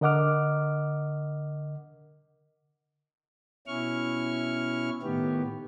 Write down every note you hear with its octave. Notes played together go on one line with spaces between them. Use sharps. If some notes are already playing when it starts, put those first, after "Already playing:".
D3 A#4 D#5 F#5 D6 F6
B2 C#4 E4 C#6 F6
A2 D#3 B3 G4